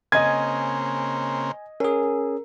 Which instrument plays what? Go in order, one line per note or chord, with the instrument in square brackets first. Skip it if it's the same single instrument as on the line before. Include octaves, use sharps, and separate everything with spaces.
[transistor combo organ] C#3 A#3 C4 [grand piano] D#5 G#6 [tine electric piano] G#5
[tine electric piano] C#4 G#4 [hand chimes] A#4